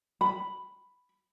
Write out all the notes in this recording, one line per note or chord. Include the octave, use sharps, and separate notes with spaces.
B5